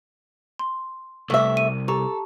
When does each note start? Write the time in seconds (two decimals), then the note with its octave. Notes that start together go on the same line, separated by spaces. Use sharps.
0.59 C6
1.30 C2 A3 E5
1.57 D#7
1.88 G4 A4 A#5 C#6